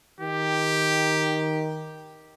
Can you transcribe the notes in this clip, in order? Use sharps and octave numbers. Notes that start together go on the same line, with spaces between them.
D#3 G4